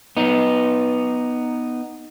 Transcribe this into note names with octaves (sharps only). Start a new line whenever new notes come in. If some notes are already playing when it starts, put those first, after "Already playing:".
B3 D#4